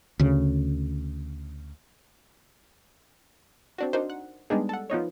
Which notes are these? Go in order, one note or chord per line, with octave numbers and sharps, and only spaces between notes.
D2 C#3
C4 D4 F#4
D4 D#4 F#4 A#4 C5
F#5
G3 G#3 B3 D4 D#4 G#4
A4 F#5
F3 B3 D#4 C#5